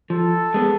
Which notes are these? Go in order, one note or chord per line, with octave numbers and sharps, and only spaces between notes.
F3 A4
G#3 B3